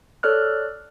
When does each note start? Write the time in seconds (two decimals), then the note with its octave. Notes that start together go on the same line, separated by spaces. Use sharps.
0.23 A4 C#5 D5 F6 F#6